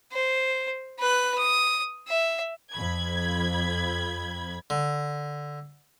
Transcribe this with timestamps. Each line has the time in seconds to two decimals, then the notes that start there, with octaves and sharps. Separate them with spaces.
0.12 C5
0.99 B4 F#6
1.38 D#6
2.08 E5
2.73 F2 B5 G#6
4.70 D3